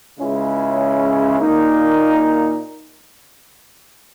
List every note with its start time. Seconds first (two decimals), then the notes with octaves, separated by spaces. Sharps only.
0.18 C#2 C#3 G#3 C#4 E4
1.40 A#2 A#3 D#4